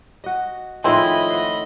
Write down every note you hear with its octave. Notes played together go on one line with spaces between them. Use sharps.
F#4 D#5
A2 D#3 F3 G#3 C4 E4 D#5 B5
C5 F#5